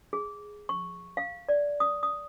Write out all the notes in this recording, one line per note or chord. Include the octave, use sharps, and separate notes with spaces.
G#4
C#6
F5
D5
D#6
D#6